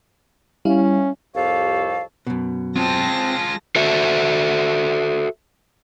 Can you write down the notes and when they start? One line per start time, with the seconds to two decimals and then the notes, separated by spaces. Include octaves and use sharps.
0.65 G3 C#4 E4 F5
1.35 C2 F2 G4 A4 C#5 F5
2.27 F#2 B2
2.76 G#3 C4 F4 A5 A#6
3.76 F#4 A4 C5 E5